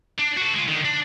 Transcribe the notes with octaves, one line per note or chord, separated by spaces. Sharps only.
D4
F#4 A4
G#3 F4
D3 D#3
D4